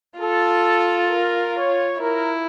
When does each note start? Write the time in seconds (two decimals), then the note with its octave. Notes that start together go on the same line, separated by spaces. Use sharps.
0.19 F4 A4
1.09 A#4
1.56 C#5
2.00 E4 A#4